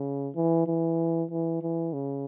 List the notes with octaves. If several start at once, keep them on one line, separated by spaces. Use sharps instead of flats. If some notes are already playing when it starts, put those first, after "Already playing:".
Already playing: C#3
E3
E3
E3
E3
C#3